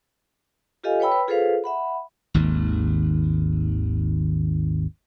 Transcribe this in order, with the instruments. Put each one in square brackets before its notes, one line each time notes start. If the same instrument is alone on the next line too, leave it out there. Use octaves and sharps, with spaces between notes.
[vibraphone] F4 G4 A4 D#5 F5 G#5
B4 C#5 G5 B5 E6
B4
F4 G#4 A4 B4 C5 F5
E5 F#5 B5
[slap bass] G#1 D#2